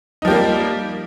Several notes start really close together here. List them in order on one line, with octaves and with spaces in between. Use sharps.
D#4 F3 G4 A#3 G3